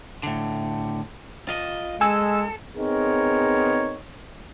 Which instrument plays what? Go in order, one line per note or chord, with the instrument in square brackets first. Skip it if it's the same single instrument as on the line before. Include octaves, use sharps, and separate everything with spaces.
[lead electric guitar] A2 D3
F4 D#5
[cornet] G#3 [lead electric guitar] A4 [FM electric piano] G#5 E6
[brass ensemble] B3 C4 D#4 G#4 A#4 C#5